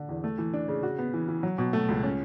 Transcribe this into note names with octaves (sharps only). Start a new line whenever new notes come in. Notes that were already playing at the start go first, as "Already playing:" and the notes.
Already playing: D3
E2
A3
E3
D4
C#3
F#4
B3
E3
E3
F#3
B2
A3
C#2
C#4